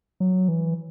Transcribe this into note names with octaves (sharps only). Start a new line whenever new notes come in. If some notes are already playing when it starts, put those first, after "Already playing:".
F#3
E3